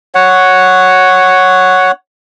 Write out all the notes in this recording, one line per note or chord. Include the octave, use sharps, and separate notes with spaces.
C#5 F#5